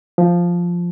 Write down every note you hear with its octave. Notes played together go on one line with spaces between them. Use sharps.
F3